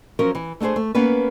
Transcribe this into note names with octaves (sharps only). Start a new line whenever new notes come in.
F3 F#3 C#4 A#4
E3
A3 D4 F4 G#4 C5
A3
A#3 B3 C#4 B4